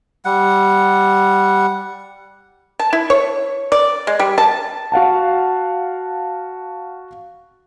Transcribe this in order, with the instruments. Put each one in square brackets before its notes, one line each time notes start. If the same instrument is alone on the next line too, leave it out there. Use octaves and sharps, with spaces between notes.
[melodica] G3 F#5
[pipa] A5
E4
C#5
D5
G#3
G3
A5
[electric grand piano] F#4 F5 F#5 A5